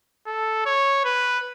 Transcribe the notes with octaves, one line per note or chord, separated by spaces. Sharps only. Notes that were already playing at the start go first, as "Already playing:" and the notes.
A4
C#5
B4